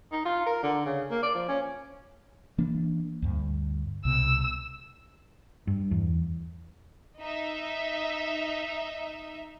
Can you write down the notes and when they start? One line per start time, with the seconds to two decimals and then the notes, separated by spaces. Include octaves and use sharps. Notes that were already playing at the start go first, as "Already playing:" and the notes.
0.12 D#4
0.25 F4
0.46 A#4
0.63 D3
0.86 C#3
1.11 A#3
1.23 D5
1.35 F3
1.48 C#4
2.58 E3 A#3 D4
3.22 D2 G2
4.05 C2 B2 E6
5.67 G2
5.91 E2
7.20 D#4 E5